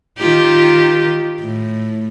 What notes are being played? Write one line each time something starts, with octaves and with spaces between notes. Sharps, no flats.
D#3 F4 G4
A2